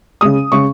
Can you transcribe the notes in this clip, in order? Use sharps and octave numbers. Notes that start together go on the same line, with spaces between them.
C#3 G#3 D#6
C#3 G#3 C#6